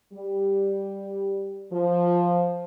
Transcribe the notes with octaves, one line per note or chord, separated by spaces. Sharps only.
G3
F3